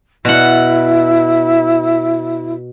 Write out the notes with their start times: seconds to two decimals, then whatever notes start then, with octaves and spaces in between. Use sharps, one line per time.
0.25 B2 E4 F#5